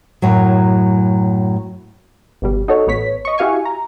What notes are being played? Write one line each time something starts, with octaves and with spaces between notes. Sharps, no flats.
F#2 A2 F#3
G1 B2 G3
D#4 F#4 A4 C#5
A1 B3 C#5 B6
D#5 C#6
E4 F#4 G4 F5 G#5 C#6
A#5